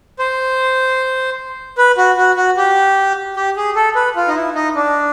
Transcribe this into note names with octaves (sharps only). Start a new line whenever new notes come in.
C5
B4
F#4
F#4
F#4
G4
G4
G#4
A4
B4
F4
D#4
E4
D#4
D4